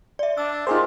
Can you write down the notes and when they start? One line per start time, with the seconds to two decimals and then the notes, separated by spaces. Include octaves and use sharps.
0.19 D5 E5
0.37 D4 E6
0.67 A#3 D#4 F4 G4 G#4 C5